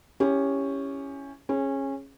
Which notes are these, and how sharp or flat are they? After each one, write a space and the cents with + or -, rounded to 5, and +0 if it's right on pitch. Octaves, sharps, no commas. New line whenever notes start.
C#4 +0 E4 +0 G4 +20
C#4 -20 G#4 +0